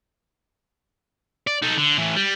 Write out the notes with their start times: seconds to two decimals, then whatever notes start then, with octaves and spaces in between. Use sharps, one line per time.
1.47 D5
1.62 D#4 A4
1.78 D3
1.97 A2 E3
2.16 G3